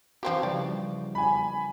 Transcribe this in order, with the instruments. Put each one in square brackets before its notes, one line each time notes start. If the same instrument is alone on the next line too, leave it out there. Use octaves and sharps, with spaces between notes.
[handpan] E3 F#4 [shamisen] F3 C4 G4
[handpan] C#3 F3 G3 [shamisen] D5
[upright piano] G#5 B5